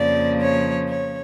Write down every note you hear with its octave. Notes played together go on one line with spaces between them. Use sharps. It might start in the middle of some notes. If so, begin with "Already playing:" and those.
Already playing: F2 C#3 F3 A#3 D5
C#5
C#5